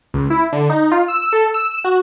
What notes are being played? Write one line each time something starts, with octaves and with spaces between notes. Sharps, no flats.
C#2
E4
D3
D#4
F4
E6
A4
E6
E7
F#4